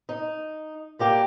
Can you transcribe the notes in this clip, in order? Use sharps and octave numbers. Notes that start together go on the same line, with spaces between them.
D#4
G3 A#3 G4